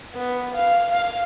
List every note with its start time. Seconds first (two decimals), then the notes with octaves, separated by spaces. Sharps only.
0.14 B3
0.54 F5
0.91 F5